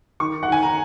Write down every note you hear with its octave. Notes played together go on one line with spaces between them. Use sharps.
D#3 C#6
F#5
D#3 G#5
A#5